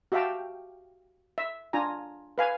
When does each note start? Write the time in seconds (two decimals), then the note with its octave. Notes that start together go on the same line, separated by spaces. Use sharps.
0.12 F#4 G4 E5 F5 G5 A5
1.38 E5
1.73 D4 F4 G#5 A#5
2.38 B4 F5 G#5